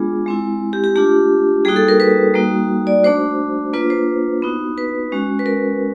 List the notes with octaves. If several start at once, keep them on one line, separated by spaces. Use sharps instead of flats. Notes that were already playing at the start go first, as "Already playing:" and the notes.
Already playing: G#3 B3 D4 F4 G#4
G#3 C4 E4
G4
G4
A3 D4 F4 G4
G3 A#3 D#4 F#4 G#4
A4
A#4
B4
G3 A#3 D#4 F#4
D5
A3 D4 F#4 C5
A#3 D4 F4 B4
C5
B3 D#4 F#4
B4
G#3 C#4 F#4
B4
A#4